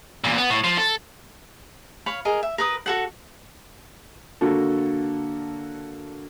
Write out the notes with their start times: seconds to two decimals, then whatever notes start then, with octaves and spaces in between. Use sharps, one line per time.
0.24 E2 A#2
0.38 B3
0.50 A2
0.64 F3
0.78 A4
2.06 C#5 F5 B5
2.25 G#4 A#4 D#5
2.43 E5
2.58 A#4 B4 D#6
2.86 F#4 A4 F#5
4.41 D3 A#3 F#4 A4